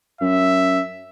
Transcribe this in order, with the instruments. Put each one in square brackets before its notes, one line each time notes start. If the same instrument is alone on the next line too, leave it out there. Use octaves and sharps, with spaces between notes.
[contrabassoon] F#2 [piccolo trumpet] E5